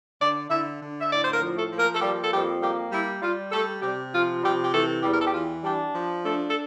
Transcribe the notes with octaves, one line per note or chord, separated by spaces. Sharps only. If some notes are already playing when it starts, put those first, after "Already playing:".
D3 D4 D5
D3 E4 E5
D3
E5
A2 D5
C5
A#3 A#4
F3
A3 A4
F3
A#3 A#4
A4
G3 A#3 G4
A4
F2 G3 G4
G3 A#3 G4
G3 E4
G3 F4
G3 A3 A4
C3 G3 G4
F3 F4
C3 G3 G4
G4
E3 A3 A4
E2 G3 G4
A#4
A4
G4
E3 F4
G3 D4 G4
F3
A3 D4 A4
A4